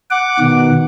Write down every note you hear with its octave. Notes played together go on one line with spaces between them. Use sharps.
F#5 D6
B2 D#3